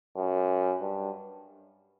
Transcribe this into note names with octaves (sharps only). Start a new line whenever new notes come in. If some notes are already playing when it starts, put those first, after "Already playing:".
F#2
G2